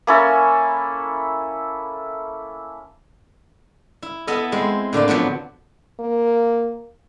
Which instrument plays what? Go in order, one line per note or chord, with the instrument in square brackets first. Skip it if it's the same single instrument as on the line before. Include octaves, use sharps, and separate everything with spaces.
[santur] A#3 C#4 E4 A4
[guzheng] E4
B3 E4 A4 D#5
G#3 C4
A2 D3 A#3 D5
F3 F#3 B3 D4
[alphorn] A#3